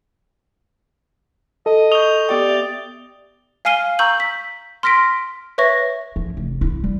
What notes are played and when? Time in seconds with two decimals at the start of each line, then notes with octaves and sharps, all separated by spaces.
1.66 A4 D#5
1.92 C#6 D#6 G6 F7 G7
2.29 B3 G4 D5 G5
2.49 E5
3.65 F5 G#5 F6 C7 D#7 G7
3.99 A#5 C#6 E6 G6 F#7
4.20 B6
4.83 C6 F6 A#6 B6 D7
5.58 B4 C#5 E5 C#6 A#6
6.16 F3
6.37 F1
6.61 E4 F4
6.84 G3